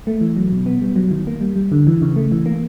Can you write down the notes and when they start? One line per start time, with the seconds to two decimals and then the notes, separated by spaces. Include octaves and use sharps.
0.07 A3
0.21 E3
0.37 F#3
0.52 B2
0.66 B3
0.82 G3
0.96 F#3
1.11 D#3
1.27 A#3
1.41 G3
1.56 G3
1.72 D3
1.87 E3
2.02 C#3
2.16 A3
2.32 E3
2.46 A#3